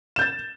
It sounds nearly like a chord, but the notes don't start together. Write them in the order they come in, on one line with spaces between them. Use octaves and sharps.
E7 G6 A6